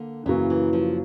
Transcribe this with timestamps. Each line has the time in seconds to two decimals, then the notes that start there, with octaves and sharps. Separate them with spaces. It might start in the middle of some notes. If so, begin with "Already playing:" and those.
Already playing: D3 A#3
0.26 F#2 C#3 E3 F#3 A#3
0.50 E3
0.73 F3